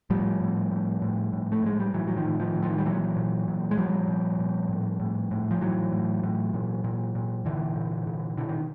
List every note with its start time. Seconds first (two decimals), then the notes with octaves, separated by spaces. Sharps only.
0.10 A2 F3 G3
0.40 A2
0.72 A2
1.02 A2
1.33 A2
1.52 A3
1.63 A2 G#3
1.80 G3
1.93 A2 E3 F#3
2.07 F#3
2.16 D#3 F3
2.24 A2
2.40 D#3 F3
2.55 A2
2.62 D#3 F3
2.78 G3
2.85 A#2 E3 F#3
3.16 A#2
3.48 A#2
3.71 G#3
3.78 A#2 F3 G3
4.08 A#2
4.39 A#2
4.69 A2
5.00 A2
5.31 A2
5.51 F3
5.61 A2 E3 F#3
5.92 A2
6.23 A2
6.54 A#2
6.84 A#2
7.15 A#2
7.45 A#2 D3 E3
7.76 A#2
8.07 A#2
8.37 B2 D3 E3
8.49 D#3